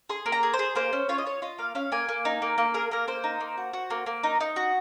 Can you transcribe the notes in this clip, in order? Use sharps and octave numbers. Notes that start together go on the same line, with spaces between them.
G#4 C6
A#3
A#5
G#4
C5
G#4
A#3 C5
C#4
F4 C#5
D#5
F4 C#5
F4 D#5
A#3 F5
C#4 F5
A#3 G#5
A#3
D#4
A#3
A#3
G#4 A#4
A#3 A#4
A#3 C5
D#4
A#3
F#4
F#4
A#3
A#3
D#4
D#4
F#4